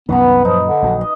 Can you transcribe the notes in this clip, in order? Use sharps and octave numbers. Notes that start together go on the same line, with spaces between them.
C2 F#2 D#3 B3 B4 A#5
F#2 A#2 F3 D#4
D3
A#1 F3 F#3
D#5